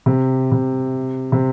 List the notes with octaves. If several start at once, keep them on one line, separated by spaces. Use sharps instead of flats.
C3
C3
C3